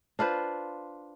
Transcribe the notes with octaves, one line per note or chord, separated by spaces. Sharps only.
D4 F4 B4 C5